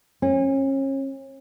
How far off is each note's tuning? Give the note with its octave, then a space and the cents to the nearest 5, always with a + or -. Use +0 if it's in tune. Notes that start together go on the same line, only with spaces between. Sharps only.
C#4 -35